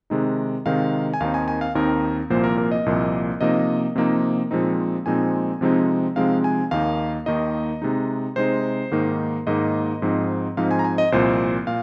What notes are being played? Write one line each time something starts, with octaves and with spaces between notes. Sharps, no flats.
C3 D#3 G#3 D#4
C3 D#3 G#3 D#4 F5
G#5
D#2 D#3 C4 D#4 F5
G#5
G#5
F5
D#2 D#3 C4 D#4 A#4
C2 A#2 F3 A#3 C5
A#4
A#4
D#5
C2 A#2 F3 A#3
C3 F3 A#3 D#4 D#5
C3 F3 A#3 D#4
A#2 F3 G#3 C4 D#4
A#2 F3 G#3 C4 D#4 G#5
C3 F3 G#3 C4 D#4
C3 F3 G#3 C4 D#4 F5
G#5
D#2 D#3 A#3 D#4 F5
D#2 D#3 A#3 D#4 D#5
C3 G#3 D#4
C3 G#3 D#4 C5
G#2 D#3 A#3 D#4
G#2 D#3 A#3 D#4 D#5
G#2 F3 C4 D#4
G#2 F3 C4 D#4 F5
G#5
A#5
G#5
D#5
C2 A#2 F3 C5
A#2 F5